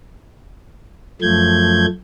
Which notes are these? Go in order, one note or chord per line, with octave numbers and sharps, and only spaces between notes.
F#2 F3 A3 G6 G#6